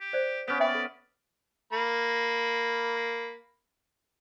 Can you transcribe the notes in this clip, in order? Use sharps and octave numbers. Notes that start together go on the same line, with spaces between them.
G4
C5 D5
B3 C#4 G4
D5 E5 G5 B5
A4
A#3 B5